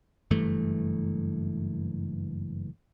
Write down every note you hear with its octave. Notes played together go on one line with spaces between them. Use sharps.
F#1 G2 E3 A3